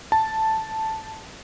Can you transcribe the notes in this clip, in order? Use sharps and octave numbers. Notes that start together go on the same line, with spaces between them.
A5